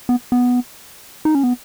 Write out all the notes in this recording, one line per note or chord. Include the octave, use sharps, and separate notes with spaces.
B3
B3
D#4
C#4
B3